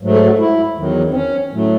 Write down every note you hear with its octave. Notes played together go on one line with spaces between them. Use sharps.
G#2 F#3 A3
A4
F#4
E4
E2 D#3 F#3
C4
C#4
A2 F#3 A3